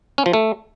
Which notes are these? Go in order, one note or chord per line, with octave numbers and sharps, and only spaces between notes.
C#4
F3
A3